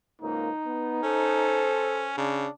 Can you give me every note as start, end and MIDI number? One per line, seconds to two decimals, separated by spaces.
0.21 0.49 37
0.21 0.49 44
0.21 0.49 58
0.21 1.74 63
0.66 1.02 59
1.03 2.13 61
1.03 2.13 69
1.03 2.13 72
2.17 2.46 49
2.17 2.50 62